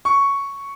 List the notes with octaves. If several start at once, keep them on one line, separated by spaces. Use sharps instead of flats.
C#6